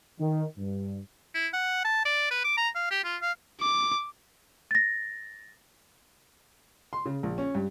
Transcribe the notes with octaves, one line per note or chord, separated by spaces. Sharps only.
D#3
G2
E4
F#5
A5
D5
B4
D6
A#5
F5
G4
F4
F5
D6
A6 A#6
C6
C#3
A#1
C#4
G2